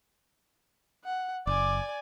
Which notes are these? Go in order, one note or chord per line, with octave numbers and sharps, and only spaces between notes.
F#5
F#1 D5 G#5 D6